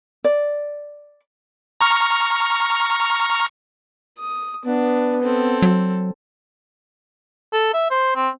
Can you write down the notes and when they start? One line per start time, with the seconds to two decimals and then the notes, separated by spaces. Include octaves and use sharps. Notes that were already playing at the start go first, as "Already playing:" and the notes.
0.24 D5
1.81 A#5 C#6 F6
4.19 D#6
4.66 B3 D4
5.23 C4 A4
5.62 F#3
7.53 A4
7.74 E5
7.91 C5
8.16 C4